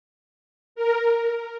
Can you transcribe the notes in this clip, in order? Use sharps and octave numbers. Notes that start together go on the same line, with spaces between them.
A#4